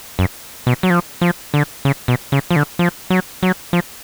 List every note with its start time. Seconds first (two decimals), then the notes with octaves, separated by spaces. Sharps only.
0.19 F#2
0.67 B2
0.83 F#3
0.90 F3
1.21 F3
1.54 D3
1.85 C#3
2.08 B2
2.32 C#3
2.51 F3
2.56 D3
2.79 F3
3.10 F#3
3.43 F#3
3.73 F3